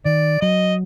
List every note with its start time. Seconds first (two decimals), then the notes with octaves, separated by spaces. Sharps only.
0.05 D#3 D5
0.41 F#3 D#5